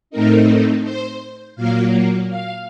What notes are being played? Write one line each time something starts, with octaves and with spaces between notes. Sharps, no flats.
A2 A3 C4 D#4 A#4
C5
A#2 F#3 A#3 F5
F5